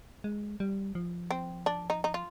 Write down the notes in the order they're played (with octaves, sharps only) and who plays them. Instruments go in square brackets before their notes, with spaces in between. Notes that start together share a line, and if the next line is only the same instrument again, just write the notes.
[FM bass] G#3
G3
F3
[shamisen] C4
D4
D#4
D#4
F4